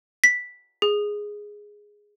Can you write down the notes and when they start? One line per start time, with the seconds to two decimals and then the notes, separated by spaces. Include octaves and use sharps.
0.24 B6
0.82 G#4